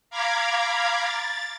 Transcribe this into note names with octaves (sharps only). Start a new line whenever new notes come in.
F5 A#5 B5 D6 G#6
A6